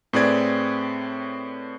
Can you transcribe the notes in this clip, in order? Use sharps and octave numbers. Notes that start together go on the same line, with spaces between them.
A2 C4 G#4 B4 D5 G#6